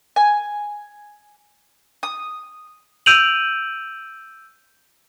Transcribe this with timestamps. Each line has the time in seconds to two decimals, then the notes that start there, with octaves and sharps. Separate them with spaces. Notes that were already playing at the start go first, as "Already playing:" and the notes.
0.16 G#5
2.03 D#6
3.06 E6 G6 D7 D#7 F7 F#7